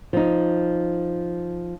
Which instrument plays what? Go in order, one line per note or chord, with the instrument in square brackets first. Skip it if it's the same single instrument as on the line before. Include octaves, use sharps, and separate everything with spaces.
[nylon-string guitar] F3 D#4